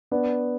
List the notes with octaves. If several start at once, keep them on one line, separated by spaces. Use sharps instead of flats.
B3 D4